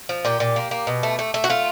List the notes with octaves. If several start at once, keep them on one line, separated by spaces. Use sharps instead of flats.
F3
A#2 G4
A#2
A#3
A#3
B2
A3
A3
A3
F#4
A3 F4